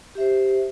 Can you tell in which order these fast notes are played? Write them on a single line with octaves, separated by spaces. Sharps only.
G4 E5 C5